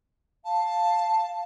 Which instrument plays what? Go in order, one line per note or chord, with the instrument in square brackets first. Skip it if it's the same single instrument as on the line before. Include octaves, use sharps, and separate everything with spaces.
[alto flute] F5 [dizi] A5